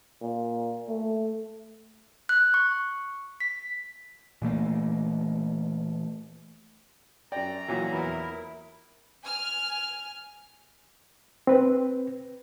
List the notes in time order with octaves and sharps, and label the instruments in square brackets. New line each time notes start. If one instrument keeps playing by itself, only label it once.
[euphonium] A#2
A3
[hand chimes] F#6
C#6
B6
[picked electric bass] A#2 E3 A3 A#3
[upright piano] F#2 G5 [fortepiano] D5 [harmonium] A#5
[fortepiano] A#2 E3 F#3
[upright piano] E2 B3 [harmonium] E4 A#4
[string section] G#5 F6
[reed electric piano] C4 B4